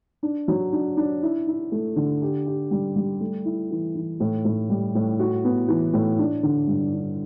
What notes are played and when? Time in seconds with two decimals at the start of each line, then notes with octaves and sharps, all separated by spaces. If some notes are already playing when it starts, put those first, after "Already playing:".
0.23 D4
0.48 F#3
0.73 D4
0.97 D4
1.23 E4
1.47 E4
1.72 A3
1.96 D3
2.22 G4
2.47 G4
2.71 G3
2.96 G3
3.20 A3
3.45 E4
3.71 E3
3.95 E3
4.20 A2
4.45 A2
4.70 G3
4.95 A2
5.20 F#4
5.44 B3
5.68 E3
5.94 A2
6.19 D4
6.43 D3
6.68 G2
6.93 D4